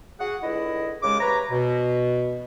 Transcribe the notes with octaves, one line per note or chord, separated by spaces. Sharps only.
F#4 G#4 F#5
C#2 D3 E4 D#5
D#2 C#3 G#3 D6
C3 B4 C#5 A#5
B2